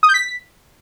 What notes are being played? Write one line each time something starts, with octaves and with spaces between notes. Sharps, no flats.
D#6
G6
B6